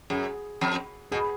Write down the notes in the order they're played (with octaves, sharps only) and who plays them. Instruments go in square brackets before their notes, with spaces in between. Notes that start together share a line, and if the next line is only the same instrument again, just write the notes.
[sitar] F#2 [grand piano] G#4
[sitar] F2
[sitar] B2 [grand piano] G#4